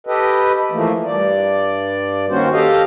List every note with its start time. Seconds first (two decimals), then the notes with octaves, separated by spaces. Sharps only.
0.07 G4 A4 B4 D#5
0.72 E3 F3 A3 A#3
1.05 G2 D5
2.30 D#3 A#3 C#4 F#4 C5
2.52 G4 A4 D#5 F5